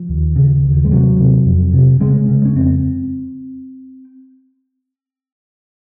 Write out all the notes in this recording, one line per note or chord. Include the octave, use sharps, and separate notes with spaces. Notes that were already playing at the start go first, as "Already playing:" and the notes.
Already playing: F3
D#2
C#3
D#2
G#3
C3 F#3
C3
F2
C3
C#3 G#3
C#3
C#4
F2 C4